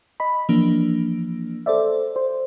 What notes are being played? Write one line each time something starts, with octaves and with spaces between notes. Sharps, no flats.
D#5 B5
E3 F3 A#3 D4
A4 C5 D5 E5
C5